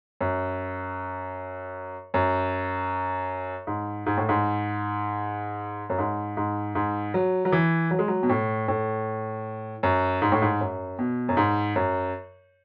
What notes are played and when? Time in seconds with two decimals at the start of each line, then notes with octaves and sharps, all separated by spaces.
0.21 F#2
2.14 F#2
3.67 G#2
4.06 G#2
4.17 A2
4.29 G#2
5.90 F#2
5.98 G#2
6.37 G#2
6.75 G#2
7.14 F#3
7.45 F#3
7.52 E3
7.91 F#3
7.99 G#3
8.08 F#3
8.23 B2
8.30 A2
8.68 A2
9.83 F#2
10.22 G#2
10.32 A2
10.42 G#2
10.61 F#2
10.99 B2
11.29 F#2
11.37 G#2
11.76 F#2